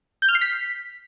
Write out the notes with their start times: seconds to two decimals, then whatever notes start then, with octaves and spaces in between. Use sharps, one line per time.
0.22 G6
0.29 F6
0.35 C7
0.41 B6